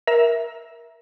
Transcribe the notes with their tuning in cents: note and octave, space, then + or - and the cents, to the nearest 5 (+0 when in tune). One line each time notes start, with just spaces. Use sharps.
A#4 +20 E5 +0